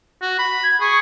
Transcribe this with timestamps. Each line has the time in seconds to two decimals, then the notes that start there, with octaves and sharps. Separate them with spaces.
0.22 F#4
0.39 B5
0.64 G#6
0.81 G#4 C#6